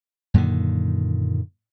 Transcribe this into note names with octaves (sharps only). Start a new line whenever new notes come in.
F#2 A#2 D3 D#3